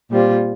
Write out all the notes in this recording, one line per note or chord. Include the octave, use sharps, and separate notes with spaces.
A#2 G3 C4 F4